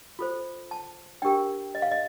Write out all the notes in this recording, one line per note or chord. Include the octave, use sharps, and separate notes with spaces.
F4 A4 C5
A5
D4 G4 A#4 G5
D#5
F5
D#5